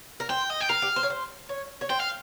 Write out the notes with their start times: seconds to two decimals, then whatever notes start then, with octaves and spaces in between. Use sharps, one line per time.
0.20 A#4
0.29 C5 G5
0.50 D#5
0.61 G5
0.69 A#4 F5
0.82 G4
0.96 C5
1.03 C#5
1.10 C5
1.49 C#5
1.81 C#5
1.90 C5 G5
2.00 F5